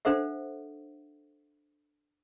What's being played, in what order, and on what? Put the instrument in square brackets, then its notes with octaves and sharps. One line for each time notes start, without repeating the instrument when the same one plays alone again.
[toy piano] D4 A4 C5 E5 F#5